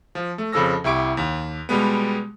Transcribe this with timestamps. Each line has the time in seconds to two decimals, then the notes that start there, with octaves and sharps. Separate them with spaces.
0.15 F3
0.38 A3
0.52 F2 C#3 F3 A4 E6 A#6
0.84 C2 E4 G4 C#6 D7
1.17 D#2
1.69 B2 G3 G#3 B3